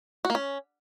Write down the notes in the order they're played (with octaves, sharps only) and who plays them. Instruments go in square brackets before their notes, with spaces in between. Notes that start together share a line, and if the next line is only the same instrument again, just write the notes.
[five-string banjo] F#4
A#3
C#4